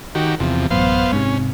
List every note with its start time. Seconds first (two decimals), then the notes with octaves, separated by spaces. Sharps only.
0.15 D#3 F#4 G4
0.40 E2 C3 F3
0.71 A1 F#2 B3 C5 F5
1.12 G#2 C3 C#4